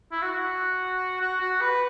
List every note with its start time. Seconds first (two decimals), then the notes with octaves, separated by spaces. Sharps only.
0.12 E4
0.22 F#4
0.32 F#4
1.21 F#4
1.41 F#4
1.61 B4